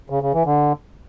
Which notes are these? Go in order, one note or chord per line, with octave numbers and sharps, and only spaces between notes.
C#3
C#3
E3
D3